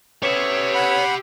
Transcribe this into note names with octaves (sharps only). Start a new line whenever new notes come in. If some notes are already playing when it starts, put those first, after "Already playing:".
A2 B3 C#4 G4 C#5 E5
F#5 B5